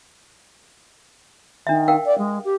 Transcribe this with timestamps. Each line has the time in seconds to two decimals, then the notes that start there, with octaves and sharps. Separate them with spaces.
1.67 D#3 D4 E5
1.88 A#4 F5 G5
2.05 D5
2.18 G#3
2.44 G4